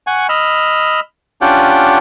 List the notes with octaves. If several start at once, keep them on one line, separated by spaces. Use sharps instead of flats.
F#5 G#5 C#6
D#5 B5 E6 F6
C#4 D4 F4 G4 F#5 G5